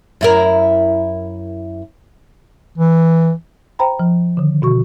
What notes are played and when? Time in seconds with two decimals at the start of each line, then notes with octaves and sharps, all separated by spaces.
0.21 F#2 E4 A#4
2.78 E3
3.79 C5 G5 A#5 B5
3.99 F3
4.37 D3 D#3
4.62 B2 F#4 C#6